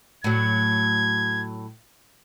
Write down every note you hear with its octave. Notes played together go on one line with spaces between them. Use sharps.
A2 F#3 G#6